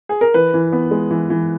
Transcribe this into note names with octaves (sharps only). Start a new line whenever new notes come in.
G#4
A#4
E3 B4
E3
B3
G#3
E3
E3